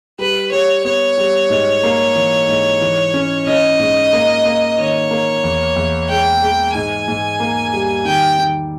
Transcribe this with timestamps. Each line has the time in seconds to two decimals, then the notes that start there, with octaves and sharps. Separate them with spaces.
0.19 G3 B4
0.52 G3 C#5
0.85 B3 C#5
1.17 G3
1.50 G#2
1.83 A#3
2.15 E3
2.48 G#2
2.81 E3
3.14 C#4
3.47 C#4 D#5
3.79 G#2
4.13 A#3
4.45 A#3
4.78 D#3 C#5
5.11 A#3
5.44 E2
5.76 E2
6.09 G#3 G5
6.42 G#3
6.75 G#2 G#5
7.08 G#2
7.40 A#3
7.73 G3
8.05 D#3 G5
8.38 D#3